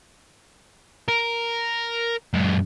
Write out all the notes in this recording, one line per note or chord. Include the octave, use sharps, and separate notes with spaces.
A#4
F#2 G#3